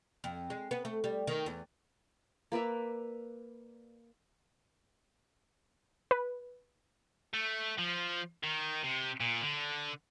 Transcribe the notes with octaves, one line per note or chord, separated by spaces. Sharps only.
F2
G#3
B3
A3
G3
D#3
E2
A#3 B4 D5 E5
B4
A3
F3
D#3
C3
A#2
D3